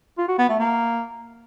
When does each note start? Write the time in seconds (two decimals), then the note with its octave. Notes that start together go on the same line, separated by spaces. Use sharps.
0.18 F4
0.28 F#4
0.39 B3
0.49 A3
0.59 A#3